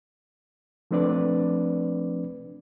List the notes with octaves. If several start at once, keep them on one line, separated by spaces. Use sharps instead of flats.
F3 A3 C4 D4 B4 D5